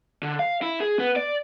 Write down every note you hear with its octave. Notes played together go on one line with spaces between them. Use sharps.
D3
F5
E4
G#4
B3
D5